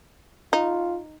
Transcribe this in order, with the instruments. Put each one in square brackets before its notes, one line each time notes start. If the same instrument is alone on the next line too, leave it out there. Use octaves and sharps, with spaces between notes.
[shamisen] D#4 [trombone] F4